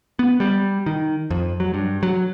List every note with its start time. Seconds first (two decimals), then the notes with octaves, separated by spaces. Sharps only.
0.19 B3
0.40 G3
0.86 D#3
1.30 F2
1.60 F#3
1.74 G2
2.03 F#3